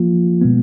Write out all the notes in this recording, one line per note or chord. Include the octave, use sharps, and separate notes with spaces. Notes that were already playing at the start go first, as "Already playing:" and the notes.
Already playing: F3 A#3 F4
B2 G#3 B3